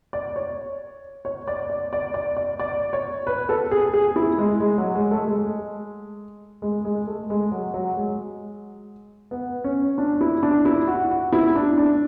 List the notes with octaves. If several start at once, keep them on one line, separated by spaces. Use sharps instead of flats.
D5
C#5
C#5
D5
D5
D5
D5
D5
D5
C#5
B4
A4
G#4
G#4
E4
G#3
G#3
F#3
G#3
A3
G#3
G#3
G#3
A3
G#3
F#3
F#3
G#3
B3
C#4
D4
E4
D4
E4
F#4
F#4
E4
D4
D4